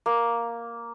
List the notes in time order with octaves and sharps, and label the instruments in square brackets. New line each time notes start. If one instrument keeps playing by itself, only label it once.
[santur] A#3